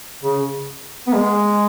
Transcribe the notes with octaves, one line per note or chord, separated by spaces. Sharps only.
C#3
B3
G#3